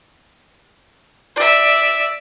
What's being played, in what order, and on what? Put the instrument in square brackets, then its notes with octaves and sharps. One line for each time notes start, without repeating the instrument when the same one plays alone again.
[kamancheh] D5 E5